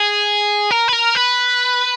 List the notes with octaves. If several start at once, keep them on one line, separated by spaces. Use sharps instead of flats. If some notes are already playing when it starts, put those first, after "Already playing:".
Already playing: G#4
A#4
B4
A#4
B4